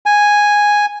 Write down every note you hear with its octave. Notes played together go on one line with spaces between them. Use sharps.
G#5